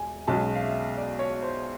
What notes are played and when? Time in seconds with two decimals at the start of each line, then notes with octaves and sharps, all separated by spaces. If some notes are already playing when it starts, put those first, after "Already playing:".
Already playing: E1 G#5
0.27 B1 B2 G#3 C#4 A5
0.55 F5
0.62 E5
0.97 D5
1.19 C#5
1.43 C5